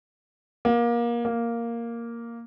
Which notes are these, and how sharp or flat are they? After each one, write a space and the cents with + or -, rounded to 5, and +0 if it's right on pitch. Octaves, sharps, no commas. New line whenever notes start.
A#3 +25
A#3 +0